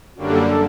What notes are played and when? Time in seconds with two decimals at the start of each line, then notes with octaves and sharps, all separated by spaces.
0.16 F#2 D3 G3 A#3 D4 F#4
0.32 A4
0.47 A4